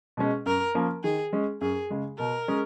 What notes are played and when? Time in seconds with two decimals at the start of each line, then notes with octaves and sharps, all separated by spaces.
0.17 B2 G#3 C#4
0.46 F#2 A#4
0.75 F3 A#3 C#4
1.03 D#3 G#4
1.33 G#3 C#4 G#4
1.61 F#2 G#4
1.90 C#3 G#3
2.19 B2 A#4
2.48 G#3 C#4 G#4